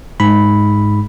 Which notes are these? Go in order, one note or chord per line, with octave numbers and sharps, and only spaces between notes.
G#2 B5